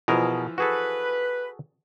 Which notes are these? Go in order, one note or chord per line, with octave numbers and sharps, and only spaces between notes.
B2 E3 F3 G#4 A#4
F#4 G#4 A4 B4